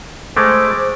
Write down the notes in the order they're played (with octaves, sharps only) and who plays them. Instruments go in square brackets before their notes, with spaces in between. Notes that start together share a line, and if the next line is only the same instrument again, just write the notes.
[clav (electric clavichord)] G#3 A3 [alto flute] C5 [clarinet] D6